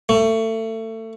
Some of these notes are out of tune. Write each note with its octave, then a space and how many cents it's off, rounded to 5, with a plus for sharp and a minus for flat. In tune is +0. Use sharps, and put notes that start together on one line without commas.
A3 +25